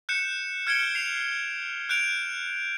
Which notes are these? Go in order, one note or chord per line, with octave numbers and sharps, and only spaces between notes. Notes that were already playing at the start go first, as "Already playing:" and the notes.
F#6 G6 C#7 E7
F6 G#6 C#7 D7 G7
C7 F7
F#6 G6 D7 F7